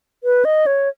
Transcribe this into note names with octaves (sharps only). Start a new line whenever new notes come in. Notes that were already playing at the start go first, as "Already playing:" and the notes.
B4
D#5
C#5